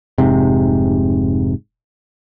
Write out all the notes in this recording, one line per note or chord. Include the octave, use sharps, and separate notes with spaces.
F1 G#2 C3